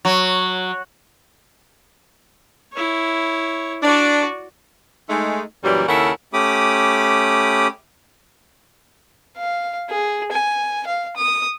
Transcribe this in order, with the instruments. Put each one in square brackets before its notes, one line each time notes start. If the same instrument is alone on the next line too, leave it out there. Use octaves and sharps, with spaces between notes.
[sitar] F#3
[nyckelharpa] E4 C#5
[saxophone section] D4 [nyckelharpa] F#4 D5
[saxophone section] G#3 A3 D#4
F#2 A#2 E3 F#3 G3
D#2 C#3 E4 A4 A#4 F#5
[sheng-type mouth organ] A3 C#4 G4 B5 D6 D#6
[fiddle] F5
G#4
G#5
F5
D#6